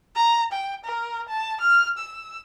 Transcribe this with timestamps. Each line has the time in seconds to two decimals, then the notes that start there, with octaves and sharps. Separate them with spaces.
0.15 A#5
0.52 G5
0.85 A#4
1.28 A5
1.61 F6
1.97 E6